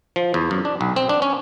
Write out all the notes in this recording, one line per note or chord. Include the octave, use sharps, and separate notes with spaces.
F3
E2
F#2
D4
B1
C4
D4
C#4